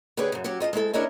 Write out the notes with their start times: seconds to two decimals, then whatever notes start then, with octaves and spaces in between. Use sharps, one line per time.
0.17 D3 G4 G#4 B4 C#5 D5
0.32 F#2 C#3
0.44 F#3 C#4 F#4 G4
0.60 F4 D#5 F#5 A5
0.73 G#3 C4 E4 A4
0.93 C#4 D4 E4 A#4 C#5 D#5